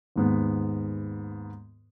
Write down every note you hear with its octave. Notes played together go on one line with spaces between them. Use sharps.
D#2 G#2 B3